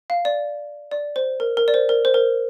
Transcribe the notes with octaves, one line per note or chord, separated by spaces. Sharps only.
F5
D5
D5
C5
A#4
A#4
D5
C5
A#4
C5
A#4